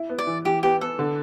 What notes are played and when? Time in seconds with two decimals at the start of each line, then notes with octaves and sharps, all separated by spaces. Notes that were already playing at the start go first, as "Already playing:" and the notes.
Already playing: E4
0.09 B3
0.18 D5
0.27 E3
0.45 E3 G4
0.63 B3 G4
0.81 B3 A4
0.99 D3